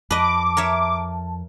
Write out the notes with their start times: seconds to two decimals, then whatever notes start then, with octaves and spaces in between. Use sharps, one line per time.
0.11 F2 B4 D#5 A5 D6
0.57 A#4 C#5 E5